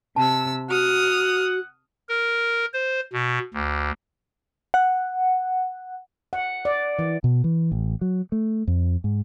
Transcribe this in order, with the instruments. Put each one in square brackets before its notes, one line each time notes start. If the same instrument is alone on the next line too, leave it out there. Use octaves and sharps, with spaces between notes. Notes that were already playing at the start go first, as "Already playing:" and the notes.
[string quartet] C3 E6 [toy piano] A5
[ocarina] F#4 [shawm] F#5 [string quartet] D#6 F6
[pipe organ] A#4
C5
B2
D2
[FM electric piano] F#5
[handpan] F#5
D5
E3
[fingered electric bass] B2
E3
A1
F#3
A3
F2
G#2